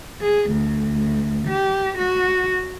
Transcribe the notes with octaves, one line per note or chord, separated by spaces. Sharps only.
G#4
D2
G4
F#4